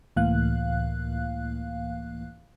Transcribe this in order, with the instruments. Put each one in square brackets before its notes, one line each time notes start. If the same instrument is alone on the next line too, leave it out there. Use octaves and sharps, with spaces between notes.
[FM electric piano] C#2 A2 E3 A#3 F5 F#6